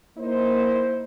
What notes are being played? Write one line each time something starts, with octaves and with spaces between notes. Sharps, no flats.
A#3 D#4 E4 C5